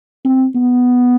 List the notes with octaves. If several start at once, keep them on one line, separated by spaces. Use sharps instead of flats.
C4
B3